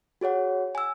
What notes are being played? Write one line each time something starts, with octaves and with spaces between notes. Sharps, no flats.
F#4 G#4 C#5 F#5
G#5 E6